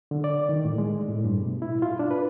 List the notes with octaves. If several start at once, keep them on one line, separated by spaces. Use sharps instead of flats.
D3
D5
D#3
A2
G#3
A2
G2
B2
E4
F4
D4
B4